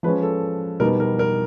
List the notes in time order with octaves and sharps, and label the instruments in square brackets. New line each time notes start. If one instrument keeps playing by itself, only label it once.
[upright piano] F3 G#3 C#4 B4
A4
B2 G3 B3 D#4 A#4
A#4
A#4